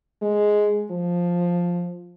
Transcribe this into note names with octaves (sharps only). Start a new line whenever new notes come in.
G#3
F3